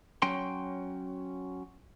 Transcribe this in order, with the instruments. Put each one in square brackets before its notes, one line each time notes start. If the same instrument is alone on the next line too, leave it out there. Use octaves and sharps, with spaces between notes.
[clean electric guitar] F#3 C#4 G5 C6